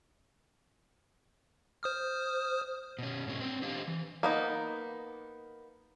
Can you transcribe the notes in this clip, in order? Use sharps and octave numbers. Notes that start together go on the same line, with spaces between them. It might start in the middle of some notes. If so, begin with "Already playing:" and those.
C5 D#6 F6
B2 C#4
G#2 B2 A#3 C#4
C4 B4 C5
D4 G4 C5 F5
E3
A#3 B3 D#4